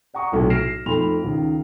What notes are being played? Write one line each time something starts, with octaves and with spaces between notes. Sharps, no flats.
D5 F#5 A#5 C#6 D#6
B1 A2 C3 F#3
F6 A#6 C7 D7 E7
F2 A3 D#4 B5 C6 F7
C#2 D#3